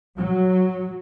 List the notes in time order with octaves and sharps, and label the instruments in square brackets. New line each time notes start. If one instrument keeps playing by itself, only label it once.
[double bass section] F#3